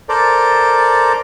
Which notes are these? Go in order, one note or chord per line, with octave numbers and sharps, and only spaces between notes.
A4 A#4 C5 D5